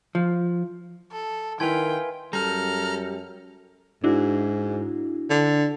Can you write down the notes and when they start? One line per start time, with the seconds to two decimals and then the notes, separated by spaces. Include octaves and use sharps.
0.15 F3
1.12 A4
1.60 D#3 E4 B4 F5 G5 G#5 C6 G#6
2.33 F#2 G3 A4 A#5 F6
4.04 G#2 D4 E4 F#4
5.30 D3